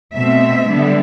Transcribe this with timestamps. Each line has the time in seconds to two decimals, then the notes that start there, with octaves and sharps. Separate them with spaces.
0.13 B2 A3 C4 E5
0.66 D3 G3 B3